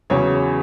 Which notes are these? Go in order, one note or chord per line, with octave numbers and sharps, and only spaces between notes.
E2 C#3 F#3 C#5